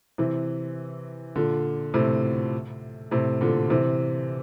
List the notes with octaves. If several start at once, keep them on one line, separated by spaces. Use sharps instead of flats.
C3 E3
A#2 D3
A2 C3
A2 C3
A#2 D3
C3 E3